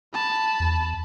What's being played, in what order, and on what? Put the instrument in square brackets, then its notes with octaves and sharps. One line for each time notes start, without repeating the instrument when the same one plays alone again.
[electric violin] A5 B5
[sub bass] E2